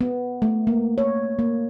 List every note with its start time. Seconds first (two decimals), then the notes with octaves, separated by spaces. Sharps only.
0.01 B3
0.42 A3
0.67 A#3
0.98 C#5
1.39 A#3